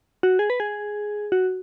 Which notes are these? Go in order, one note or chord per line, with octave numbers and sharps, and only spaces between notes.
F#4
G#4
B4
G#4
F#4